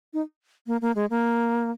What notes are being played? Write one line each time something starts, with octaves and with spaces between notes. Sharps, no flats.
D#4
A#3
A#3
G#3
A#3